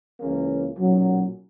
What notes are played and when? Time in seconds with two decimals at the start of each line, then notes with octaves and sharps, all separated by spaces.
0.20 C#2 C#3 E3 A#3 C#4
0.77 B1 A#2 F#3 C#4